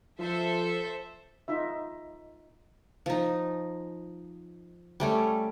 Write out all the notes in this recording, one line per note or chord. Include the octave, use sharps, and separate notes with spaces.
F3 A4 C5 E5
D#4 F4 E5
F3 D#4
G3 A3 C#4